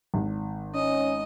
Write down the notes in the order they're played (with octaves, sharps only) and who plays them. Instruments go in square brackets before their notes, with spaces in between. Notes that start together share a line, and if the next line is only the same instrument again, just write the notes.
[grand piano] G#1
[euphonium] C#4 [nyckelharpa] D#5